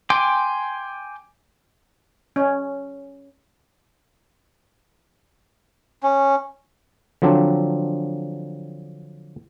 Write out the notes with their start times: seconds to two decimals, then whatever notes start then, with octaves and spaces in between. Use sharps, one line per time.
0.10 G5 G#5 C6 D6
2.36 C#4
6.03 C#4
7.22 D3 F3 F#3 C4 D4